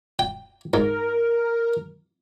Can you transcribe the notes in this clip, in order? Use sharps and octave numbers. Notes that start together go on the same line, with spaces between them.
G5
G#2 A#4